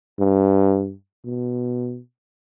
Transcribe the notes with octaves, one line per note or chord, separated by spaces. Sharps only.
G2
B2